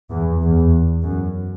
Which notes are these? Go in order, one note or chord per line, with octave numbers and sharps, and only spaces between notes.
E2
E2
F#2